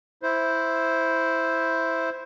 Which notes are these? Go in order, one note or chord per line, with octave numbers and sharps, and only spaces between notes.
E4 C5